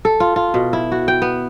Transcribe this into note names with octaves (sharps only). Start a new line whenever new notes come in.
A4
F4
F4
B2
E4
F#4
G5
B3